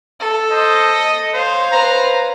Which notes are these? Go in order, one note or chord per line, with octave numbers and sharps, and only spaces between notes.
A4
C5 D#5
D#6
C5 C#5 F5
B4 C5 A#5